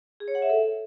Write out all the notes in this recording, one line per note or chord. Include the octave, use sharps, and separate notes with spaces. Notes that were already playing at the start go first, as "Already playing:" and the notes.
G#4
C#5
F#5
E5
A4